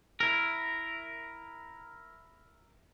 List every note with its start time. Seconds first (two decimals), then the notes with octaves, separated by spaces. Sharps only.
0.20 E4 A#4